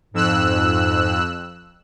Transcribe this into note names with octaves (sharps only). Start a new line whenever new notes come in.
F2 G#2 E6 F#6